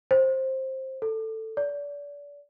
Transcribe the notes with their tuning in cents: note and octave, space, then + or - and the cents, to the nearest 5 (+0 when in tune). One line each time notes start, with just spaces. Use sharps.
C5 +15
A4 +10
D5 -35